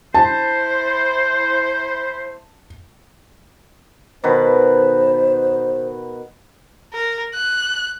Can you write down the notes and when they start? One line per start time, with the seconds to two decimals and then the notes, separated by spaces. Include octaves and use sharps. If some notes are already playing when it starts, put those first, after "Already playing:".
0.14 E4 C5 A5
4.24 B2 D#3 B4 C5
6.93 A#4
7.34 F#6